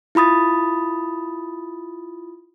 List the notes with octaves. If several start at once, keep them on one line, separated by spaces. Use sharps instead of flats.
E4 F4 B5 D#6 A6